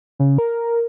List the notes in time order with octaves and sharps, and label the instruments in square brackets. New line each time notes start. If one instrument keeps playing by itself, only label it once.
[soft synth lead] C#3
A#4